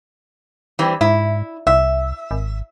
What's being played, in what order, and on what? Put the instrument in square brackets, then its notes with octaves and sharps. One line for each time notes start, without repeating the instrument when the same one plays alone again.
[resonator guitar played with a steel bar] E3 G3 C4
[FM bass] G#2 [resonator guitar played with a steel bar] E4
[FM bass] C2 [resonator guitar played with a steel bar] E5
[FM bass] G#1